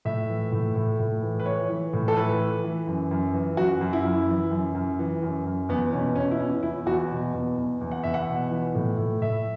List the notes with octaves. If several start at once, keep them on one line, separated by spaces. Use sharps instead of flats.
A2 E5
E3
A2
A2
A2
E3
B4
E3 C#5
E3
A2
A4
E3 B4
E3
E3
F#2
F#2
E3
F#2 F#4
F#2
E4
F#2
E3
F#2
F#2
E3
F#2
F#2
E2 B3
B2 C#4
E2 C#4
E4
E2 C#4
E2 E4
E2 F#4
B2
E2
E2
E2
F#5
E2 E5
F#5
B2
E3
A2
A2
A2 E5